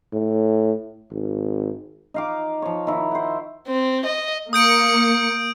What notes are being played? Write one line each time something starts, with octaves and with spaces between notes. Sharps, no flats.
A2
G#1
D#4 F5 D6
F3 C#5
D#3 E4
C5 F#5
C4
D#5
A#3 D#6 G6 C#7 D7